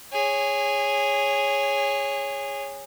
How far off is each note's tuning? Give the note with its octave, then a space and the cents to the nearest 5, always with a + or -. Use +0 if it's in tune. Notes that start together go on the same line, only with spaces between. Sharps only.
G#4 -15 C#5 +0